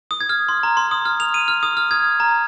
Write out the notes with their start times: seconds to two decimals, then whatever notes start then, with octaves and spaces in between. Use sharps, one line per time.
0.11 D#6
0.21 G#6
0.29 F6
0.49 C6
0.63 A#5
0.77 C6
0.91 D#6
1.05 F6
1.20 F7
1.34 D#7
1.48 F6
1.63 D#6
1.77 F6
1.91 G#6
2.20 A#5